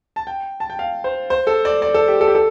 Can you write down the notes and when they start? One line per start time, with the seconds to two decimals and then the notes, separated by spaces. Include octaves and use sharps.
0.16 A5
0.27 G5
0.60 A5
0.70 G5
0.79 F5
1.04 C5
1.30 C5
1.47 A4
1.65 D5
1.82 D5
1.94 A4
2.08 G4
2.21 A4
2.27 G4
2.35 A4